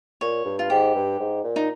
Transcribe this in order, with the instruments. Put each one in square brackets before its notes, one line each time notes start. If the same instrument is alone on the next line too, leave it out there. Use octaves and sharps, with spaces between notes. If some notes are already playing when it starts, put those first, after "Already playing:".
[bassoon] A#2 [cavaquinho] C#5
[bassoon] G2
[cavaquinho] F4
[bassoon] G#2 [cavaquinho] G4
[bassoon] G2
G#2
A#2
[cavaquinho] D#4